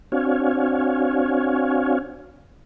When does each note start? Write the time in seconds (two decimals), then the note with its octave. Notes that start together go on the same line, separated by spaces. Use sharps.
0.12 C4 D4 F#4 C#5 F5 G#5